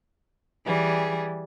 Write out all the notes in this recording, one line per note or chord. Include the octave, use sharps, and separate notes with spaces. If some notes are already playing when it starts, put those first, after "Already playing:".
E3 G3 G#4